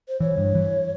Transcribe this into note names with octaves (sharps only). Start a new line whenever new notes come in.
C5
E3 C#5
G2
E3